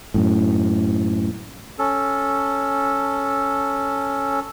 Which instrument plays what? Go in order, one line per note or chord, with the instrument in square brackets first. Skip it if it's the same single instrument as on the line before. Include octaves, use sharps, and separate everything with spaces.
[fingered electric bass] F#2 A2
[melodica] C#4 A4